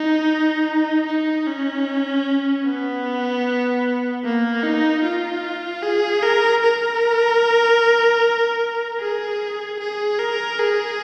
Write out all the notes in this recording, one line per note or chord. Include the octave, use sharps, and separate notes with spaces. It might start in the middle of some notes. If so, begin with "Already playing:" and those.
Already playing: D#4
D#4
C#4
B3
A#3
D#4
F4
G#4
A#4
A#4
G#4
G#4
A#4
G#4